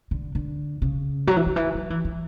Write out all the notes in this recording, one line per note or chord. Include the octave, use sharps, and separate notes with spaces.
D3
D3
C#3
F#3
E3
D3
E3
F#3
E3
E3